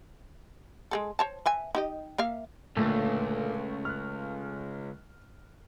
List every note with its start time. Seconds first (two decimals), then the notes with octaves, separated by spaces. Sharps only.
0.91 G#3 G#4 A4
1.19 C5 C#5 A5
1.46 B4 E5 G#5
1.75 D#4 G4 D#5
2.18 A#3 E5 F5
2.77 C#2 A#2 D3 A3
3.85 F6 F#6